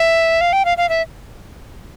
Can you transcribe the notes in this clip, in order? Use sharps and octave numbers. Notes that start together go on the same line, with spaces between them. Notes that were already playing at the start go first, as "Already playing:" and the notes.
Already playing: E5
F5
G5
F5
F5
E5